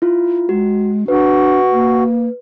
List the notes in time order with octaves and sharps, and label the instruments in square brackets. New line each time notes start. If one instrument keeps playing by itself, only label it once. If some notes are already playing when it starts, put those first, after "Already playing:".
[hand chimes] E4 F4
[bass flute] G#3 [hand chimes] F#4
[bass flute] D4 [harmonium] F#4 [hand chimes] B4
[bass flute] A#3